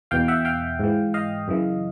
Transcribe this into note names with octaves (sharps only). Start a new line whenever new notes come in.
E2 B2 F5 G5
E5 F#5
F5 G5
G#2 E3
D#5 F5
F#2 C#3 E3